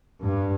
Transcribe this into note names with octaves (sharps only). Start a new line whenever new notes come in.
G2